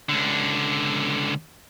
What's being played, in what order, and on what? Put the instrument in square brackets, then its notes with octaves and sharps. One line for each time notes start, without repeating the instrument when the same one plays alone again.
[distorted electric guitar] C#2 D3